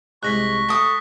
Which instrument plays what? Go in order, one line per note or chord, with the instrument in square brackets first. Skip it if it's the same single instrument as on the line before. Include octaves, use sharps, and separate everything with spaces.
[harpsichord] C2 G#3 G#5 [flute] C#6 [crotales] F#6 A#6 B6
[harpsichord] A3 G5 [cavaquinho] A4 D#6